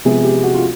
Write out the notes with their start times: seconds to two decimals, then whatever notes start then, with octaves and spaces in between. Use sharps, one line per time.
0.05 C3 F3 G#3 B3 G#4
0.24 G4
0.44 F#4
0.54 F4